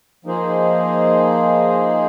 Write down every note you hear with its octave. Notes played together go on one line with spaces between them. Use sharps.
F3 A#3 D#4 G#4 C5